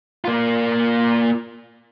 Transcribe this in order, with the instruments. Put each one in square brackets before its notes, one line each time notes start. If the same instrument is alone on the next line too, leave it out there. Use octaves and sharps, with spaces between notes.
[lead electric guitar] A#3 F4